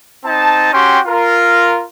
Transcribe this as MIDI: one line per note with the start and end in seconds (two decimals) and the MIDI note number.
0.24 0.69 60
0.24 0.69 63
0.24 0.69 81
0.73 0.99 61
0.73 0.99 66
0.73 0.99 67
0.73 0.99 79
0.73 0.99 84
1.06 1.83 65
1.06 1.83 70